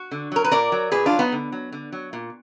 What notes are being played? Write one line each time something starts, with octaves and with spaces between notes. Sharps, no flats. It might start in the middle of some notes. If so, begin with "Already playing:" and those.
Already playing: F#4
D3
F#3 A#4
B4
A#2 A#4 D5
F#3
A#2 G#4 B4
D4 F4
F#3
B3 D#4
D3
F#3
D3
F#3
A#2